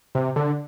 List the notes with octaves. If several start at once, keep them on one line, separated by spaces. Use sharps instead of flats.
C3
D3